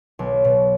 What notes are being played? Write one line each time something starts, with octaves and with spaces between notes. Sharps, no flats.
B1
B2